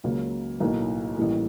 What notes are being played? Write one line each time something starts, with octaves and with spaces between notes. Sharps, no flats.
C#2 C#3 F#3 A#3
B1 A2 F#3 A#3 D#4
A1 A2 E3 G3 A#3